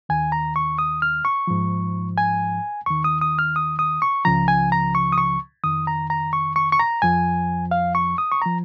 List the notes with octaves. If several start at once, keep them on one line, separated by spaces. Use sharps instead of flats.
D#2 D#3 G#5
A#5
C#6
D#6
F6
C#6
G#2 F3
G#5
D#2 D#3 C#6
D#6
D#6
F6
D#6
D#6
C#6
C#2 C#3 F3 A#5
G#5
A#5
C#6
D#6
C#6
F2 D#3 D#6
A#5
A#5
C#6
C#6
C#6
A#5
F2 F3 G#5
F5
C#6
D#6
C#6
F3 A#5